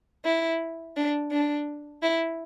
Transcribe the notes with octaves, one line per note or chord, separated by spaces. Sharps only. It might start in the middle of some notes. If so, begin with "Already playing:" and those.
E4
D4
D4
E4